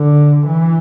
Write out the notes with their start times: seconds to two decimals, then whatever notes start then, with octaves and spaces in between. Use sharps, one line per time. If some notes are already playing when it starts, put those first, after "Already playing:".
Already playing: D3
0.48 E3